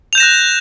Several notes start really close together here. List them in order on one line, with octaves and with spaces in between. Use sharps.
F7 G6 E7 A#6 F#6